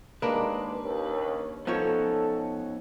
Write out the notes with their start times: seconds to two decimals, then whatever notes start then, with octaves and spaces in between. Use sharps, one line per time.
0.22 D#2 G#3 A#3 D4 B4
0.83 D#2 C#4
1.67 F3 B3 C#4 D#4 A4 C#5